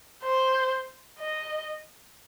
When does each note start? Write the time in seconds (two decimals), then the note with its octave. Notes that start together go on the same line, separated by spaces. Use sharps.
0.24 C5
1.19 D#5